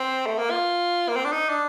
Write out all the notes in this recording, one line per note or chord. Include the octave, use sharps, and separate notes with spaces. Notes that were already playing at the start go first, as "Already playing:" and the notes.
Already playing: C4
A3
A#3
F4
A#3
C4
D4
D#4
D4